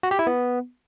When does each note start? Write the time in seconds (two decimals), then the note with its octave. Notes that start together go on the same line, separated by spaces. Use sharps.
0.03 F#4
0.11 G4
0.19 E4
0.27 B3